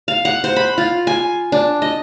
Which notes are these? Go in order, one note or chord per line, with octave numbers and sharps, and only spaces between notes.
F5
F#5
C5
B5
F4
G#5
D4
D#5